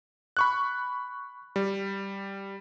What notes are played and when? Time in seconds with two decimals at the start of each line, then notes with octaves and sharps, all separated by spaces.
0.37 B5 C#6 F#6
1.56 G3